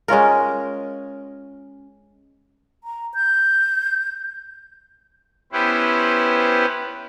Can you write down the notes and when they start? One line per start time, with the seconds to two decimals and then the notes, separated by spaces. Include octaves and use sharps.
0.08 G#3 C#4 F4 A#4
2.84 A#5
3.14 G6
5.52 B3 C#4 E4 G4 B4 C5